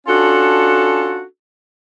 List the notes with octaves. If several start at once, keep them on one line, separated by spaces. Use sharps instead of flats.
C#4 D4 F4 F#4 A4